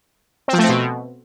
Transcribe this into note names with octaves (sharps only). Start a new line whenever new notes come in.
C4
F3
A3
C4
B2